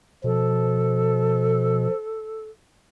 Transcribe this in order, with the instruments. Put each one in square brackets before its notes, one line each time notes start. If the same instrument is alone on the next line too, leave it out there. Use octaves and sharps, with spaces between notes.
[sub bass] B2 [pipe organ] F3 [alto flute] A4